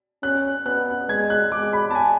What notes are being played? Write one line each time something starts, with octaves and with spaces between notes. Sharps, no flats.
C#4 F#6
B3 F#6
G#3 G#6
F#6
G#3 D6
B5
A5
G#5